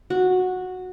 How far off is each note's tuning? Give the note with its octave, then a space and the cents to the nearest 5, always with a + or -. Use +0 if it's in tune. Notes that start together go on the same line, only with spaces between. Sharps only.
F#4 -10